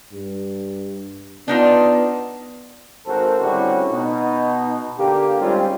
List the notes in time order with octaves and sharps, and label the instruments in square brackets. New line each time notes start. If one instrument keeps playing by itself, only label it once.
[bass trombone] G2
[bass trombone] B3 [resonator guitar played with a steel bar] D4 D#4 F4
[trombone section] G#1 F#4 A4 A#4 C5
A2 D3 G3 C4 C#4 F#4
B2 D#4
D3 A#3 G4
G3 G#3 C4 C#4 D#4 F4